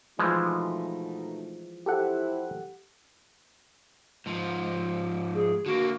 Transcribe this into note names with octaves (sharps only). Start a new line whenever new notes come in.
B2 E3 F3 G#3 A3 D#4
E4 G4 A4 C5 F#5
G#2 F3
G#4
D3 A#3 F#4